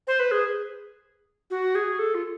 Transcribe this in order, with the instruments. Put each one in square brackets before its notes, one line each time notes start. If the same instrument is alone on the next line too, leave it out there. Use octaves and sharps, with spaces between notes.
[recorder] C5
B4
G#4
F#4
G#4
A4
F4